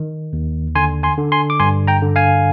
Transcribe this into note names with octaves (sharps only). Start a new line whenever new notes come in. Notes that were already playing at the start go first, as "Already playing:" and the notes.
Already playing: D#3
D#2
D3 G#5 C6
G#5 C6
D3
G#5 C6
D6
G2 G#5 C6
G5 A#5
D3
F5 G#5